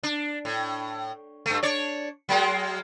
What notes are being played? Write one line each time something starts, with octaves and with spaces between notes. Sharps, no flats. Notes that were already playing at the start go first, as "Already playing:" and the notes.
D4
A2
G2 A3
D4 C#5 D5
F#3 G#3 A#3